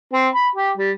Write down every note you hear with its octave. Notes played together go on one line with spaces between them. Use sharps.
C4
B5
G4
G3